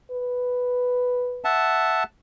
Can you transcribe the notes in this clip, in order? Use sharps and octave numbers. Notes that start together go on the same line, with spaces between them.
B4
E5 F#5 A5